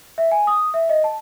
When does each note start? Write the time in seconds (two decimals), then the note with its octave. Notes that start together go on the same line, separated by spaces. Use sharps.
0.18 E5
0.31 G#5
0.47 D#6
0.74 E5
0.89 D#5
1.04 A5